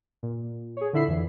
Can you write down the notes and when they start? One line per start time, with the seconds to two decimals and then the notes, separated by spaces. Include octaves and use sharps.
0.23 A#2
0.77 G#4 C#5
0.93 A#2 D3 E4 E5 B5 C7
1.08 F2 E3